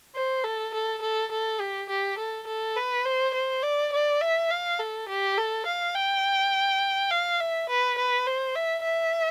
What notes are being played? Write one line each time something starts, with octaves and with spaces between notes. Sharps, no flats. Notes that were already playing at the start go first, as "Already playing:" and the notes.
C5
A4
A4
A4
A4
G4
G4
A4
A4
B4
C5
C5
D5
D5
E5
F5
A4
G4
A4
F5
G5
F5
E5
B4
B4
C5
E5
E5